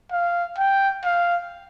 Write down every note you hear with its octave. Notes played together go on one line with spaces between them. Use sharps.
F5
G5
F5